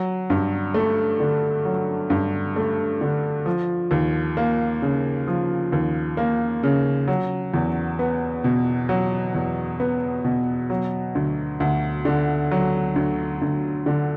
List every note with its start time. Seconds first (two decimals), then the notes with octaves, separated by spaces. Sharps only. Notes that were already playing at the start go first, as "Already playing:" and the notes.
Already playing: F#3
0.30 G2
0.74 A3
1.20 D3
1.65 F#3
2.10 G2
2.56 A3
3.01 D3
3.46 F3
3.91 D#2
4.37 A#3
4.82 C#3
5.27 F3
5.72 D#2
6.17 A#3
6.63 C#3
7.08 F#3
7.54 E2
7.99 B3
8.44 B2
8.89 F#3
9.35 E2
9.80 B3
10.24 B2
10.70 F#3
11.15 D2
11.60 D2
12.05 D3
12.51 F#3
12.96 D2
13.42 D2
13.86 D3